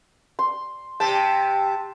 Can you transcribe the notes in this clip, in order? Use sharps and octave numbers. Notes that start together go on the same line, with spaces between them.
C6
C3 G4 A5